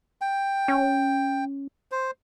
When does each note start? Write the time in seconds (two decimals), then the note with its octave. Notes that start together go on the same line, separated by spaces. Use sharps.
0.21 G5
0.68 C#4
1.91 C5